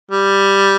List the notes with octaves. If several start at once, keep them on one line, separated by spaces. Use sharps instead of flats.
G3